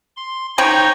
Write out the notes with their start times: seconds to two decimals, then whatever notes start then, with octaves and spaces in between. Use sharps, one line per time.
0.17 C6
0.58 C#3 C4 D#4 C#5 G5 C#6